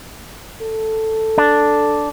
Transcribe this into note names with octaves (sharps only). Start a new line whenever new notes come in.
A4
D4